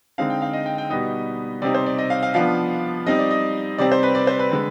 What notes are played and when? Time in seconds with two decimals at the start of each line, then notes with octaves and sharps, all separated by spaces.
0.18 D3 G#3 C4 D#4 F5
0.30 G5
0.42 F5
0.53 D#5
0.66 G5
0.78 G5
0.90 B2 G3 B3 D#4 D#5
1.62 C3 G3 C4 D#4 D5
1.75 C5
1.86 D5
1.98 D#5
2.10 F5
2.23 F5
2.34 F3 B3 D4 F4 F5
3.07 G3 C4 D#4 D#5
3.19 D5
3.31 D#5
3.78 C3 G3 C4 D5
3.92 C5
4.03 B4
4.15 D5
4.27 C5
4.39 B4
4.52 D3 G#3